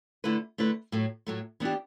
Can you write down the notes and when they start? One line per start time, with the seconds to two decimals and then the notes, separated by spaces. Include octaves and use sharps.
0.24 D3 A3 E4 B4
0.58 D3 A3 E4 B4
0.92 A2 F#3 A3
1.26 A2 F#3 A3
1.60 E3 B3 D4 G4